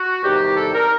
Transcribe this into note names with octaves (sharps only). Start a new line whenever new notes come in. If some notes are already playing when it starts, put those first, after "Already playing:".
Already playing: F#4
E2 C3 D#3 G3 G4
A4
A#4